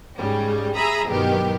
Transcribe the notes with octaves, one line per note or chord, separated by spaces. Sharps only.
G#2 C#3 G3
G#4 E5 A#5 B5 D#6
G2 B2 D#3 F#3 B3 G4